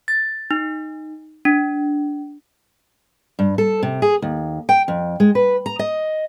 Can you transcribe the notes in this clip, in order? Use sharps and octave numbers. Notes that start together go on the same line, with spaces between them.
A6
D#4
D4
G2
A4
C3
G#4
D#2
G5
F2
G#3
B4
A#5
D#5